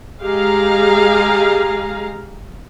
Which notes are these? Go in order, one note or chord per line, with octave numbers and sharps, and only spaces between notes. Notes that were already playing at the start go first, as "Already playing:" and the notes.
G#3 G4 G#4 F5 A#5